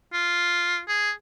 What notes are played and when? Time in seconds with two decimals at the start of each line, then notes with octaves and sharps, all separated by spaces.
0.13 F4
0.88 G#4